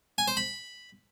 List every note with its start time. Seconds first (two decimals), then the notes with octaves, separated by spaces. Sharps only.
0.18 G#5
0.28 C5
0.37 B5